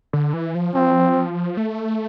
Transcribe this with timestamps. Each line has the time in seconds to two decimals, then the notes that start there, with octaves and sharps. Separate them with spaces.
0.13 D3
0.33 E3
0.55 F3
0.75 F3 C4
1.57 A3